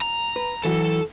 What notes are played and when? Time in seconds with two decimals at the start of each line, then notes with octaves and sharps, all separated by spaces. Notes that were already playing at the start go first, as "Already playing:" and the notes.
0.01 A#5
0.36 B4
0.65 E3 F#3 F#4 A4